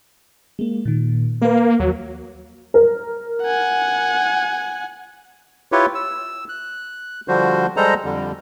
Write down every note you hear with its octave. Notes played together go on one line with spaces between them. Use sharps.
G#3 A#3
A#2 D#3
A#3 A#4 B4
D#2 F#3
A#4
F#5 G#5
E4 F4 G4 B4 C#5
E6
F#6
D3 F3 G3 F#4 C5
G3 G#3 A4 C5 D#5 A#5
F2 D3 G3